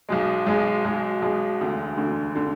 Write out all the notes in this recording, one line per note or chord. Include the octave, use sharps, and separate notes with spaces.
B1 B2 G#3
B1 B2 G#3
B1 B2 G#3
B1 B2 G#3
E1 D2 D3
E1 D2 D3
D3